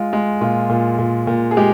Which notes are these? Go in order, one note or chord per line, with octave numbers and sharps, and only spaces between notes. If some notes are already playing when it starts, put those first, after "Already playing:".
Already playing: G#3 F4
G#3
A#2 F4
A#2
A#2
A#2
G#4
G#3 G4